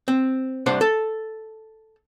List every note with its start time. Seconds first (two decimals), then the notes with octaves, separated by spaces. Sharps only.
0.08 C4
0.66 C2 D4 C5 F#5
0.81 A4